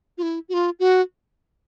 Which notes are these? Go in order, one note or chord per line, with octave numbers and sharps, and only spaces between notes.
F4
E4
F#4
F4
F#4